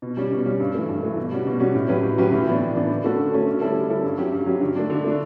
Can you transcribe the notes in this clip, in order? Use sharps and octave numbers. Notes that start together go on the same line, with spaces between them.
B2
G3 C#4
B2
G3 C#4
G2
E3 A3
G2
E3 A3
B2
G3 C#4 F#4
B2
G3 C#4 F#4
A2
F#3 C#4 G4 B4
A2
F#3 C#4 G4 B4
A2
E3 B3 D4
A2
E3 B3 D4
D3
A3 C#4 F#4 A4
D3
A3 C#4 F#4 A4
D3
G3 C#4 E4 A4
D3
G3 C#4 E4 A4
G2
F#3 C#4 G4
G2
F#3 C#4 G4
D3
A3 D4
D3
A3 D4